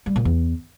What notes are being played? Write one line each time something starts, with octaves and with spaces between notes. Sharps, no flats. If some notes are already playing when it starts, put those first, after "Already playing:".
G3
A#2
E2